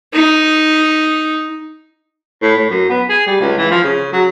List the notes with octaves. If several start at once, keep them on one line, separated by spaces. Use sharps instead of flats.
D#4
A2
A2
F#2
B3
G#4
G3
C#2
E3
F3
C#3
F#3